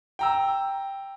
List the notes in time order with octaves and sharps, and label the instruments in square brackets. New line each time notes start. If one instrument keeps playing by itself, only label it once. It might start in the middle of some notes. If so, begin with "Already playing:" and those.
[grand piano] G5 A#5 E6